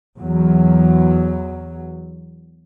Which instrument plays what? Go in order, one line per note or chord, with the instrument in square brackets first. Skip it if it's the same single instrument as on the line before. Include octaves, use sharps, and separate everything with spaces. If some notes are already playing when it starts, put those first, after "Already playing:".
[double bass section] E2 F#3